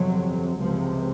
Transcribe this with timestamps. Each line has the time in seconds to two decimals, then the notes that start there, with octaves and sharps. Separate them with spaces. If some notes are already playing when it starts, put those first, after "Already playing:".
Already playing: G1 F2 C3 F#3
0.58 C#2 C3 F3